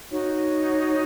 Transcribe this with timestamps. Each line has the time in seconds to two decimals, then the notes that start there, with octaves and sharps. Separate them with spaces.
0.11 D#4 F#4 C#5